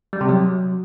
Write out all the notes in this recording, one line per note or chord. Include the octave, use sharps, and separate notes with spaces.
G3
C3
F#3